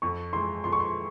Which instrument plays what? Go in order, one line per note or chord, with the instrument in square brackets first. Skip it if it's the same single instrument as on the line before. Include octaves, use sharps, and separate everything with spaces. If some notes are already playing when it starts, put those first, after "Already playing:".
[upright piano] F2 [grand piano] C#6
[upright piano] E3 G#3 E4 [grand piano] C6
[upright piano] F2 [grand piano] C6
[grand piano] C#6
C6